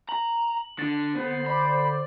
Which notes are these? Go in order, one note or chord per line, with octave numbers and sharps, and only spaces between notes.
A#5 F#7
D3 A6
D3 B3 C5
D5 B5